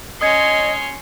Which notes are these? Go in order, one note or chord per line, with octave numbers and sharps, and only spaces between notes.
C#4 C#5 D#5 C6 D#6 G#6 C#7